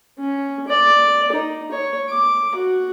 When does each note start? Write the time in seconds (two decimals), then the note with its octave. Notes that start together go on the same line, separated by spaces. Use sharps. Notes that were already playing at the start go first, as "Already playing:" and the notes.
0.18 C#4
0.68 D5
1.32 D#4
1.71 C#5
2.10 D6
2.55 F#4